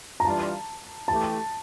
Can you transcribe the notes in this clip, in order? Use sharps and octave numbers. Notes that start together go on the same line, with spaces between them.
A#5
E3 G3 D4 F4 A5
E3 A3 E4 G4 A5